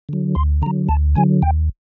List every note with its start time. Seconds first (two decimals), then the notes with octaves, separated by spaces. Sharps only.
0.09 D3 F#3
0.35 D2 C6
0.62 D3 A#5
0.66 F#3
0.89 D2 A5
1.15 D3 F#3 G#5
1.42 D#2 G5